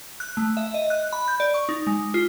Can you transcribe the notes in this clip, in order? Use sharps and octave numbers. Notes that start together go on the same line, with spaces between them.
F#6
A3
E5
D#5
F#6
B5
G6
D5
C#6
D#4
G#3
F4